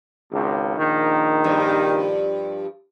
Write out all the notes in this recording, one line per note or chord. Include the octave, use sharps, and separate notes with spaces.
G#1 C#2
A#1 D#3
G2 F3